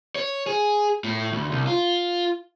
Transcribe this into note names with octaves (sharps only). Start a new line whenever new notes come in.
C#5
G#4
A2
D2
C2
F4